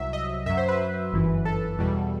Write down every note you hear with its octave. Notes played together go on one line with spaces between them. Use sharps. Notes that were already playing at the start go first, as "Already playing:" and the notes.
Already playing: C2 C3 F#3 E5
D#5
F#2 F#3 E5
C5
B4
G1 F#2 E3
A4
E2 B2 G3